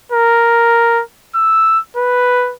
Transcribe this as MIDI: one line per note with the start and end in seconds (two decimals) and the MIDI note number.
0.12 1.02 70
1.35 1.79 88
1.97 2.54 71